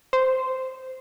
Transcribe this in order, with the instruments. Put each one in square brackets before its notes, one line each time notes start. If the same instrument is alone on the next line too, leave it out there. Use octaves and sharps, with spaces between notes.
[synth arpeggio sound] C5